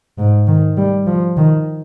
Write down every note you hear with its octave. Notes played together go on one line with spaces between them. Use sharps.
G#2
D#3
G3
F3
D#3